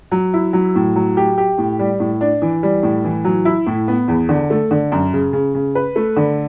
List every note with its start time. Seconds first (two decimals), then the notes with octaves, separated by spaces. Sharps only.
0.12 F#3
0.34 E4
0.53 F#3
0.75 A2
0.96 F#3
1.17 G4
1.38 G4
1.58 A2
1.79 G3
2.00 A2
2.21 D4
2.42 E3
2.63 G3
2.83 A2
3.04 E3
3.25 F#3
3.45 E4
3.67 A2
3.88 B3
4.08 E2
4.29 D3
4.50 A3
4.71 D3
4.92 F#2
5.13 C#3
5.33 C#3
5.55 C#3
5.75 B4
5.96 A3
6.16 D3